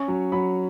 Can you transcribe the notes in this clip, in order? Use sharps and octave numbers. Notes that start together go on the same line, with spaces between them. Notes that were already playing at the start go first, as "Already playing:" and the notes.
Already playing: C#4 C#6
F#3
F#3 B5